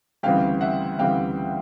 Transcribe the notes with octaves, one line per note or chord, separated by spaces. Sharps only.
D2 C#3 E3 G3 C4 F5 G5
E5 F#5
D2 C#3 E3 G3 C4 F5 G5